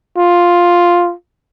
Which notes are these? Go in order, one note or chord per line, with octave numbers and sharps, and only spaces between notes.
F4